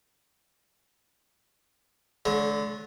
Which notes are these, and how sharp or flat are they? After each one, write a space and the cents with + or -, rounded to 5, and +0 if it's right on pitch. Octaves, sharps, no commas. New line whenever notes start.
D3 -20 G#3 +45 C#5 -35